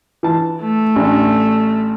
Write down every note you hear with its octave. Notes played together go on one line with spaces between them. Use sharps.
E3 A5
A3
A1 D4